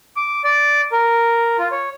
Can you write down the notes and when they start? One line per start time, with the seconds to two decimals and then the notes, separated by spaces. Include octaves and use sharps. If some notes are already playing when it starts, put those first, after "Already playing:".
0.16 D6
0.44 D5
0.92 A#4
1.59 F4
1.71 C#5